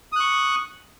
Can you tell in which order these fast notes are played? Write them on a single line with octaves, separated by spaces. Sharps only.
D#6 F#6 C#6